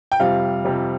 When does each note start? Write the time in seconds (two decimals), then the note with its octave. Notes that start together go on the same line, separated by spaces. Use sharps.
0.12 G5
0.20 F2 C3 G3 F5
0.65 F2 C3 G3